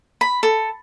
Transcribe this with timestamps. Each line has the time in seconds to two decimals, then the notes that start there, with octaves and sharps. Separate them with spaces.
0.21 B5
0.43 A4